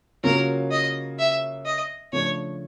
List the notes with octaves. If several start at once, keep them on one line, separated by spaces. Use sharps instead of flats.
C#3 F#3 A#3 C#4 F4 A#4
D#5
E5
D#5
C#3 F3 A3 D4 C#5